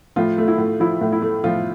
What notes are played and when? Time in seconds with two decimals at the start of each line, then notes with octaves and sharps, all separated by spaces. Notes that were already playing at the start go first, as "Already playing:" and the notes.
0.16 A2 F3 F4
0.38 A3
0.48 E4
0.58 A2
0.80 F3 E4
1.01 A2
1.12 E4
1.22 A3
1.44 A2 F3 F4